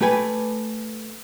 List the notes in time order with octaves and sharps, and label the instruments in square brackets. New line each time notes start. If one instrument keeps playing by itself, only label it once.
[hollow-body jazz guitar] A3 G4 B4 G#5